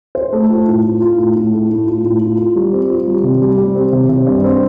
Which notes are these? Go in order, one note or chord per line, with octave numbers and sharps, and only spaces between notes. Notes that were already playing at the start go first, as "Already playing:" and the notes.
C5
A3
F4
A2
F4
F4
A2
A2
A3
A2
F4
A2
F4
F4
G3
C4
F4
G3
C3
G3
G3
C4
C3
C3
G2
C4